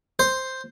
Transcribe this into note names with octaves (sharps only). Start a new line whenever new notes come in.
C5